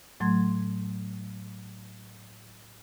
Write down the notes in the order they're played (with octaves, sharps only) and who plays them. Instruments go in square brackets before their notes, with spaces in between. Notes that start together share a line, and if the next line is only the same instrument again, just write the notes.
[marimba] A2 F#3 A3 C6 G#6